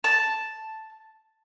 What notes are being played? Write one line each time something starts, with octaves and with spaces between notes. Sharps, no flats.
A5